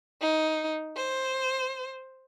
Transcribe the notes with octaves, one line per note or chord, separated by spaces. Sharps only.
D#4
C5